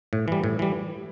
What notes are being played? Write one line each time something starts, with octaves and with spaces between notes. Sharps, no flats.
A2
E3 G3
A2
E3 G3